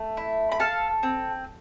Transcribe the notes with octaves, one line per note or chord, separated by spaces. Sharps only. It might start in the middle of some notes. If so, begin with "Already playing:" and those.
Already playing: A3
E4
B5
A4 F5 A5
C4